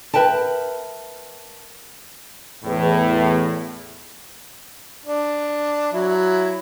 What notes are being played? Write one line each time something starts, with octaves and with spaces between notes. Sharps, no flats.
A#4 B4 E5 G5 A5
E2 A2
D4
F#3 E4